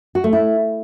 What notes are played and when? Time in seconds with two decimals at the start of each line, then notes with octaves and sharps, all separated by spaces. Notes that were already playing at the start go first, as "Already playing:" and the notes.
0.15 F#4
0.24 A3
0.33 E4